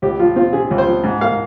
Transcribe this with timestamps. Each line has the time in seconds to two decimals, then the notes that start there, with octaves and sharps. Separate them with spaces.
0.02 C#2 G4
0.19 F3 F4
0.36 C4 F4
0.53 C3 G#4
0.71 C#2
0.78 C5
0.87 F3
1.04 G#2
1.21 A#3 F5